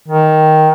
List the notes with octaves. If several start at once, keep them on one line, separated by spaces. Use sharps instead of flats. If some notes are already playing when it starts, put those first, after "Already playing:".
D#3